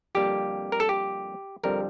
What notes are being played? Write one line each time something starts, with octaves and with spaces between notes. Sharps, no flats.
F2 D3 G3 A#3 G4
A#4
A4
G4
F2 D3 G3 C4 A#4